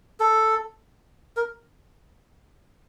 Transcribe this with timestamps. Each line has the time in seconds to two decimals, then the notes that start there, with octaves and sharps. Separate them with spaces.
0.20 A4
1.37 A#4